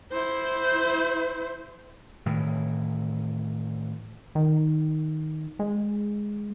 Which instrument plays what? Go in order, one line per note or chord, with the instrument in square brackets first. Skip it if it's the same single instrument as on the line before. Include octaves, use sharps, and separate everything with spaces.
[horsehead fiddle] E4 C5
[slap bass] A2 D#3 E3
[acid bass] D#3
G#3